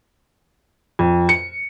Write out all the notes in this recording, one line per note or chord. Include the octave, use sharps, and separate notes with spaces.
F2
C#7